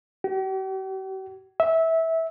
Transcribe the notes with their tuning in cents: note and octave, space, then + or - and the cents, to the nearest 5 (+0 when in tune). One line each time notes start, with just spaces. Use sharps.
G4 -45
E5 -15